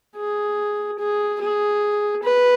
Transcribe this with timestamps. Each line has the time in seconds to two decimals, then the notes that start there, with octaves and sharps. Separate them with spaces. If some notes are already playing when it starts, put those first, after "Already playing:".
0.16 G#4
0.98 G#4
1.40 G#4
2.23 B4